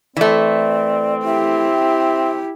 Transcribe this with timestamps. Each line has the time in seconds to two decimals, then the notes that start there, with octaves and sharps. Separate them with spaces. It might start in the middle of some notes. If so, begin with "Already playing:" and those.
0.17 E3 A3 C4 D5
1.26 E4 G4 E5